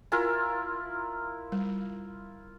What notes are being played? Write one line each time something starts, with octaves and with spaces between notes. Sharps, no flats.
E4 F4 A#4 G#5
G3